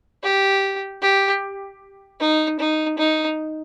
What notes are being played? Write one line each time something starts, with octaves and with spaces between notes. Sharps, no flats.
G4
G4
D#4
D#4
D#4